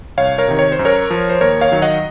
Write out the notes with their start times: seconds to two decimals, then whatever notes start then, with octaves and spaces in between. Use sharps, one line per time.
0.18 C2 C#5 F5
0.38 A#4 C#5
0.48 C3 D#3
0.59 C#5
0.72 C5
0.79 F#2
0.85 A#4 C#5
1.10 F3
1.29 C5
1.41 D#2 A#4 C#5
1.61 C#5 F5
1.72 D#3 F#3
1.82 D#5 F#5